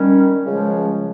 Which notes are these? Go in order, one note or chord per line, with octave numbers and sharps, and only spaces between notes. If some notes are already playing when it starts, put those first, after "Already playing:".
Already playing: D#3 G3 C#4
C#2 C#3 F3 G#3